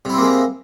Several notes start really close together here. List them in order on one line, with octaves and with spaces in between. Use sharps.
C3 E4 C4 A#3 G#3